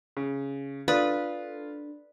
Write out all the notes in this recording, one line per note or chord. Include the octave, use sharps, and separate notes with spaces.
C#3
D4 F4 A4 B4 D5 D#6